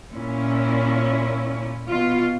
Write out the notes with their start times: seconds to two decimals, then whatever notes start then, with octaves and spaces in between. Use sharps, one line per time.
0.13 A#2 C#4 E4
1.87 B2 F4